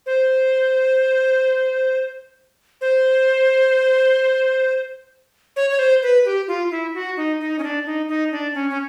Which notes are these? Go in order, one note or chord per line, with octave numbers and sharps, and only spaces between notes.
C5
C5
C#5
C#5
C5
B4
G4
F4
E4
F#4
D#4
D#4
C#4
D4
D#4
D#4
D4
C#4
C#4